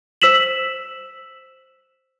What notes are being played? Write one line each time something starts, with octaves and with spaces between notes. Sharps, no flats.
C5 E6 B6 E7 F#7